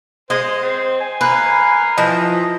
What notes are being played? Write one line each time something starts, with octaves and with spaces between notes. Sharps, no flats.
G#3 C5 D#5
C4
G#5
A#3 B4
E3 F3 D#5